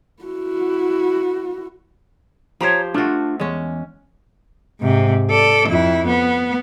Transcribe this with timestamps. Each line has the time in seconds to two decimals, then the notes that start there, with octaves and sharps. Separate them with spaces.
0.22 E4 F#4
2.61 F3 G4 C5 C#5 A#5
2.94 A3 D4 F4 F#4
3.40 E2 G#3 C#4
4.81 G#2 C3
5.31 A4 D5
5.69 F2 E4
6.07 B3